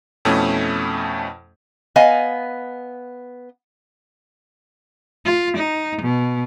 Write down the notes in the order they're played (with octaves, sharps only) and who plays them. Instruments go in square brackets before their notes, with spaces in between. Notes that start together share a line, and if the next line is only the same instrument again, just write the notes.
[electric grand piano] F2 B2 A3 C#4 E4
[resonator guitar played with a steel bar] B3 D#5 F5 G#5
[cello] F4
D#4
B2